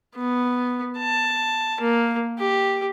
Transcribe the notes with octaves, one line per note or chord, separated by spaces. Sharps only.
B3
A5
A#3
G4